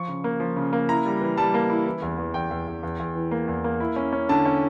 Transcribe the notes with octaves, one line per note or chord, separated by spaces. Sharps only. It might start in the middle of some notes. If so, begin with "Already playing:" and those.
Already playing: F3 C#6
C#3
A#3
F3
C#3
A#3
E4 A#5
G3
E3
G3 A5
A#3
E4
E3
E2
E2
E2 G5
E2
E2
E2
E2
E3
A#3
E2
A#3
E4
C#4
C#4
D3 A5
C#4